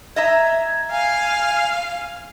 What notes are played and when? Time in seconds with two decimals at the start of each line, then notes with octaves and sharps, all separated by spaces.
0.16 D#5 E5 A#5 G#6
0.91 F5 G#5